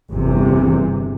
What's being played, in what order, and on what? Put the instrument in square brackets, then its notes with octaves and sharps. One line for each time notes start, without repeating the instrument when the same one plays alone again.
[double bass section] G1 E2 C3 E3